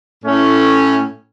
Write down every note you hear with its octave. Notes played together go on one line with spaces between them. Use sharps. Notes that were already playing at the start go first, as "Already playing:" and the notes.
A2 A3 C#4